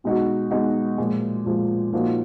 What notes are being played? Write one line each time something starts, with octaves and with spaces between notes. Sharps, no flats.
B2 G#3 D#4 F#4
B2 G#3 D#4 F#4
A#2 F3 G#3
A#2 F3 G#3
A#2 F3 A#3 D#4 F#4